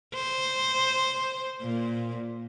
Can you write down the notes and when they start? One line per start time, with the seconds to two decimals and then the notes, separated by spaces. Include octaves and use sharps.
0.15 C5
1.62 A#2